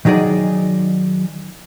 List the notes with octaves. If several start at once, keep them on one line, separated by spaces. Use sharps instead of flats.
D#3 F#3 D#4 G#4 D5